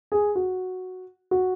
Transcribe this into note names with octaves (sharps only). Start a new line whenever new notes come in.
G#4
F#4
F#4